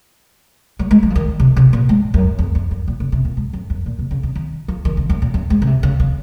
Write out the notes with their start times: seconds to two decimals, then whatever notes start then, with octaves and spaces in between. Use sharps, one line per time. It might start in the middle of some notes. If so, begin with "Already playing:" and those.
0.79 F#3
0.91 G#3
1.03 F#3
1.10 F3
1.16 D#3
1.40 C3
1.57 C3
1.73 A#2
1.89 G#2
2.14 F#2
2.39 F2
2.55 F#2
2.71 F#2
2.88 A#2
3.00 C#3
3.12 C3
3.25 A#2
3.37 G#2
3.53 F#2
3.70 F#2
3.86 A#2
3.99 C3
4.11 C#3
4.23 C3
4.36 D#3
4.68 F3
4.85 D#3
4.97 C#3
5.10 F#2
5.22 A#2
5.34 F#2
5.50 G#2
5.62 C#3
5.67 C3
5.83 C#3
6.00 C#3